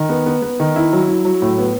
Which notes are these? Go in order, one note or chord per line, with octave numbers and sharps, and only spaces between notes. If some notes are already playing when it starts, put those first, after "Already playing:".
Already playing: D#3
B3
B3
B3
D#3
E4
F#3
E4
F#3
A2
B3